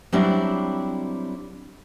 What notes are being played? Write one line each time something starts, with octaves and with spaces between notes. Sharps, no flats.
F#3 G3 C4 D4 E4